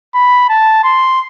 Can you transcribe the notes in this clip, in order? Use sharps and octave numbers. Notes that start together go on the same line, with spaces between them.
B5
A5
C6